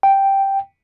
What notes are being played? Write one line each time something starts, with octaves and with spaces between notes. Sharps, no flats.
G5